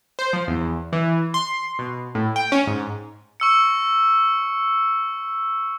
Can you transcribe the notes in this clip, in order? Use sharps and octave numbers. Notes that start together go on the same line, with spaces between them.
C5
F3
E2
E3
C6
B2
A2
G5
C#4
G#2
C#6 E6 C#7